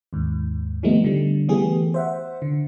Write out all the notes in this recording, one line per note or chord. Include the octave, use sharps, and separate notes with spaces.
D#2 G#2
D#3 F3 G3 A3 B3 D#4
D3 G3
E3 A3 B3 G4 G#4
C5 E5 F#5
D3